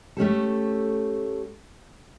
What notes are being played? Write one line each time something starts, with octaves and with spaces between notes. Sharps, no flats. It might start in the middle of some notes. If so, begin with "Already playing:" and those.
A3 C#4 G4 A4